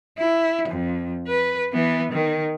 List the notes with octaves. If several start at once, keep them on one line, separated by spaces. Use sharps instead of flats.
E4
F2
B4
E3 B3
D#3